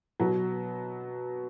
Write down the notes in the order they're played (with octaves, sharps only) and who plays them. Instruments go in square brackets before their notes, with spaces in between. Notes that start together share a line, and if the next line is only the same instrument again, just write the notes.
[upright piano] B2 F#3 B3 F#4